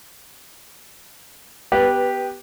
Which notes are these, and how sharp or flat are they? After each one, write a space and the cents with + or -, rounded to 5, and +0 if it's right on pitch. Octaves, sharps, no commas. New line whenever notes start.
B3 +0 G4 +0 B4 -15